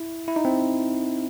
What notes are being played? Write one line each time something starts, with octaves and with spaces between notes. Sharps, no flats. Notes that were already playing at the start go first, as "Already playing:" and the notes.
Already playing: E4
E4
D#4
C4